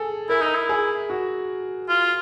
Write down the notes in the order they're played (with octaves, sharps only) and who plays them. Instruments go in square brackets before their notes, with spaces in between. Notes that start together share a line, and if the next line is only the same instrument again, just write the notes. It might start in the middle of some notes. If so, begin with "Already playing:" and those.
Already playing: [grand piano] G#4 A4
[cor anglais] E4 [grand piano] A#4
[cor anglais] D#4
E4
[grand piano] G#4
F#4
[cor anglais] F4